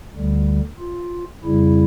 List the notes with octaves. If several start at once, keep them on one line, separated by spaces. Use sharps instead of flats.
D2 D3 G3
F4
F2 C#3 G3 E4